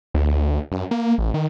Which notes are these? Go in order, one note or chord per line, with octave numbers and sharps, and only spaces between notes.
D2
F#2
A#3
A1
D#3